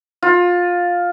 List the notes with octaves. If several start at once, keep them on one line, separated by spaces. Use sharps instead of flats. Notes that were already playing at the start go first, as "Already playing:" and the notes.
F4